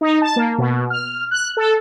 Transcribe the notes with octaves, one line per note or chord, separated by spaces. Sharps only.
D#4
A5
A#3
B2
F6
F#6
A4